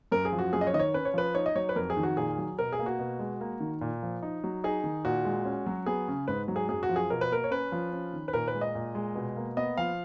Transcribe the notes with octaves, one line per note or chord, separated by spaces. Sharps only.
F#2 A#4
G#4
F3
F#4
F#2 G#4
D#5
C#5
D#3 D#5
C#5
C#4 B4
C#5
F3 B4
D#4 C#5
D#5
F#3 C#5
B4
F2 A#4
G#4
D#3
F#4
A#2 G#4
F#3
B2 A#4
G#4
A#3
F#4
B2
G#3
A#3
D#3
A#2
F3
D#4
F#3
D#4 G#4
D#3
A#2 F#4
G#3
C#4
F#3
B3 G#4
C#3
G#2 B4
F#3
G#4
F#2 G#4
F#4
F3
G#4
B2 A#4
B4
A#3 A#4
C#5
C#4 B4
F3
C#4
D#3
B4
A#2 A#4
B4
G#3
D#5
A#2
G#3
B2
A#3
B3 D#5
F3 F5